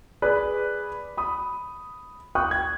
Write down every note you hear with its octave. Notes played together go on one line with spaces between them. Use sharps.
G#4 B4 D5
B5 D#6
G5 C#6 D#6 F#6
G#6